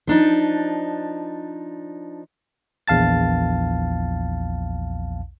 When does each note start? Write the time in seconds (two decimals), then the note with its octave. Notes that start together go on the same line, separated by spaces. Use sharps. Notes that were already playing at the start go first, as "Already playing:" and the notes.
0.07 F3 D4 D#4
2.88 A#1 E2 F5 A5 A6